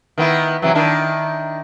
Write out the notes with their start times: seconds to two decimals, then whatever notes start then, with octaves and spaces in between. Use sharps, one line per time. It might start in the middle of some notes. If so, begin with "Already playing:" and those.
0.18 D#3 B3 E4
0.62 C3 E3 F#3
0.75 D#3 D4 E4